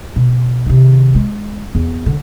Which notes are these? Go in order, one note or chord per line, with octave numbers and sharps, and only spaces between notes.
B2
C3 D#3
G#3
E2
D3